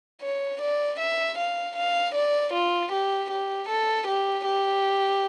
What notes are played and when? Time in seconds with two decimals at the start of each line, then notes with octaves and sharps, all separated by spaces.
0.22 C#5
0.61 D5
0.99 E5
1.38 F5
1.76 F5
2.15 D5
2.53 F4
2.92 G4
3.30 G4
3.69 A4
4.07 G4
4.46 G4